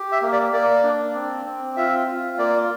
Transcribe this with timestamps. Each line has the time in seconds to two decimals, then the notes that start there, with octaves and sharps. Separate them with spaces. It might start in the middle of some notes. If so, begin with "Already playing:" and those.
Already playing: G4
0.12 E5
0.22 A#3
0.32 D5
0.52 A#3 D5
0.84 D4
1.15 C4
1.45 C4
1.77 F4 E5
2.07 F4
2.38 A#3 D5